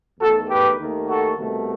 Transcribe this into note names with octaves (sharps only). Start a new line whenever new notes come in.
E2 D#3 A3 F#4 A4
G4 B4
D#2 D#3 A3
F#4 A4
C2 B2 A3